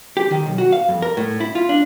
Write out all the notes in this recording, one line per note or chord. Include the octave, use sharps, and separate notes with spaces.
G4
D#3
B1
F#4
F5
F2
A#4
A2
E4
F4
D4